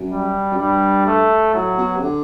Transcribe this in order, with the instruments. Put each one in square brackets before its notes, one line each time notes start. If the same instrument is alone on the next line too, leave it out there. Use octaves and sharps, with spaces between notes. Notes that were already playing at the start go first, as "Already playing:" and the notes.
Already playing: [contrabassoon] F#2
[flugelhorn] G3
[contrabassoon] F#2
[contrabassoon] G2 [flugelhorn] G3
[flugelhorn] A3
[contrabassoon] A2 [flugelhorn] F#3
[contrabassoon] B2
C3
D3